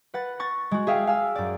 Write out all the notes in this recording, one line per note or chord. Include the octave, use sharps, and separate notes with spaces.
B4 F#5 A6
C#6 A6 A#6
G#3 F#4
G#4 E5 F5 G5
F5 G#5 E6
F#2 D5